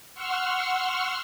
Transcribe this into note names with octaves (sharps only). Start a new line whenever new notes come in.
F#5 C6 C#6 E6 F6